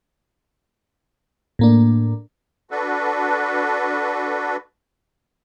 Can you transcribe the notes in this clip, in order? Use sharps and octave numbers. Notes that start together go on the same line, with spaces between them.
A2 A#3 D4
D4 F#4 A4 B4